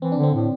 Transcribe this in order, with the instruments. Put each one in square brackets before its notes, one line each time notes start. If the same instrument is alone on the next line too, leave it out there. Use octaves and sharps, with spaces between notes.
[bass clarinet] E3 [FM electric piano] C4
[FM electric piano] D4
[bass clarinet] D3
[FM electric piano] C4
[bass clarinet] A2